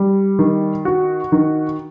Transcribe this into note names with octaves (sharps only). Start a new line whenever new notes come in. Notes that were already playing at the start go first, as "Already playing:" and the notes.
Already playing: G3
D#3
F#4
D#3